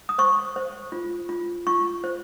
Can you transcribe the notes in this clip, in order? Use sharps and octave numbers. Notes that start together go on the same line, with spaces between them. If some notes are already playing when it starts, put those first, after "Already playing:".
D#6
C5 C#6
C5
F4
F4
F4 C#6
C5